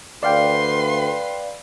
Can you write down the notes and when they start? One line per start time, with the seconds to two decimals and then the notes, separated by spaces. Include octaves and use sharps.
0.23 D2 B4 D5 F5 G5 C6